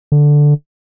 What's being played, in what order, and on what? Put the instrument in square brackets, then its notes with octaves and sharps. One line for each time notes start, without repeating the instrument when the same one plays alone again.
[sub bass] D3